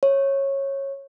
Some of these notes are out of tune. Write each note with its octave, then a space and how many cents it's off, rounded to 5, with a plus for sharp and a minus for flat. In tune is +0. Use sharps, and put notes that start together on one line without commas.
C#5 -15